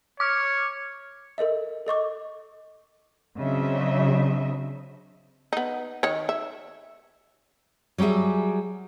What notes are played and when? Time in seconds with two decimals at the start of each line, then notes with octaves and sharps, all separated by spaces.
0.20 C#5 D6 F6
1.38 A4 A#4 D#5 E5
1.87 A4 D#5 C#6 D6
3.38 C#3 F#3 C4 D4 D#5 E5
5.53 B3 D#4
6.03 D#3 C#5
6.29 E5
7.98 F#3 G3 G4 G#4 E5